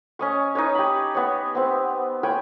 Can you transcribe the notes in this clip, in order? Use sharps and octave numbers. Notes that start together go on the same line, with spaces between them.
C#4 D#5 C#6
D#4 B4 C#5
G4 B5
B3 C#5
B3 C4
C#5 G5 G#5 B5